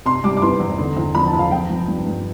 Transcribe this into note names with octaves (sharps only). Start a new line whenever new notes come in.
C3 C6
G3 D6
D6
E3 C6
E2
D3
E2
F3 B5
A5
E2
F5
F3 G5
F3
G2
G2